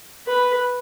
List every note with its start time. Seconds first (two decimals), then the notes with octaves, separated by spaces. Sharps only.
0.27 B4